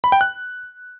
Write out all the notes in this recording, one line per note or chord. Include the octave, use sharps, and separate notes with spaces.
B5
G5
F#6